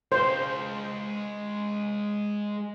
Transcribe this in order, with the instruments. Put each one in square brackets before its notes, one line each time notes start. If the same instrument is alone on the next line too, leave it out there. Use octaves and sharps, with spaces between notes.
[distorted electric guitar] G#3 F5 [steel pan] C5